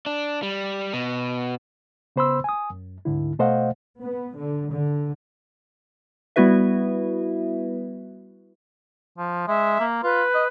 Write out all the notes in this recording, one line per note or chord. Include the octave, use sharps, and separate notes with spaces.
D4
G3
B2
C#3 B3 C5 B5 C6 E6
G#5 D#6
F#2
D2 G#2 D3 E4
B2 A3 C5 D#5 F5 F#5
B3
D3
D3
G3 B3 E4 F#4 B4 E5
F3
G#3 E5
A#3
F4 B4
D#5